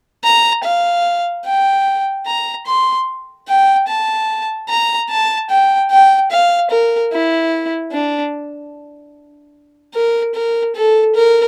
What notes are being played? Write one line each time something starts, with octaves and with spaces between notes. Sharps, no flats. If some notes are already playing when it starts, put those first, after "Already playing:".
A#5
F5
G5
A#5
C6
G5
A5
A#5
A5
G5
G5
F5
A#4
E4
D4
A#4
A#4
A4
A#4